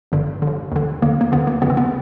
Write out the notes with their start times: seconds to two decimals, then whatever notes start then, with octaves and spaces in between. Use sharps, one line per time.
0.12 G1 G2 D3
0.42 D#2 D3
0.72 D#2 D3
1.02 D#2 D3 A#3
1.21 A#3
1.32 D#2 D3 B3
1.47 A#3
1.62 G1 F2 C#3 B3
1.70 C4
1.77 B3